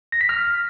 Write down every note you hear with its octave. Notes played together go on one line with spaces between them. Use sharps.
A#6
B6
F6